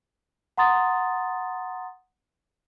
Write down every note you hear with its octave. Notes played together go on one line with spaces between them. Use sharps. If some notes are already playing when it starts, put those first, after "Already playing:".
F#5 A#5 C6 D#6 A6